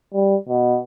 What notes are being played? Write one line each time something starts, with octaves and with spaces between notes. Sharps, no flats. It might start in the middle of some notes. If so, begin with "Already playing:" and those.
G3
B2